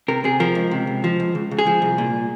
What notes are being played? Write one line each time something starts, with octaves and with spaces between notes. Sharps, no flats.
C3 A#4
C3 G#4
F3 A#4
C#2
C3
C#2
F3
C#2
C#2
C#2
G#4
F3
C2
A#2